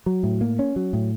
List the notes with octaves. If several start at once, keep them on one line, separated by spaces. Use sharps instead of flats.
F#3
A2
A#3
C#4
F#3
A2